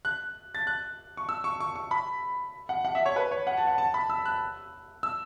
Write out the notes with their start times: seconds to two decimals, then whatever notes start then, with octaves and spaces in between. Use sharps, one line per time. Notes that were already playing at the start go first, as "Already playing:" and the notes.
0.05 F#6
0.55 A6
0.67 F#6
1.17 C#6
1.29 E6
1.44 C#6
1.60 C#6
1.76 C#6
1.91 B5
2.69 F#5
2.85 F#5
2.95 E5
3.06 C#5
3.16 B4
3.31 C#5
3.47 F#5
3.57 A5
3.67 F#5
3.78 A5
3.94 B5
4.10 E6
4.25 F#6
5.03 E6